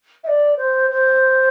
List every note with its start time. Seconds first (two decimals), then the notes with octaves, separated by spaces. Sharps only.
0.23 E5
0.27 D5
0.56 C5
0.90 C5